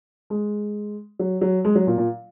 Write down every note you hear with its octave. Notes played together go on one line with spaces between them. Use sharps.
G#3
F#3
F#3
G#3
F#3
A#2
A#2